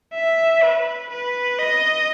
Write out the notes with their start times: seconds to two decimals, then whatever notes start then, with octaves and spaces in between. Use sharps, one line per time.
0.14 E5
0.63 B4
1.11 B4
1.59 D#5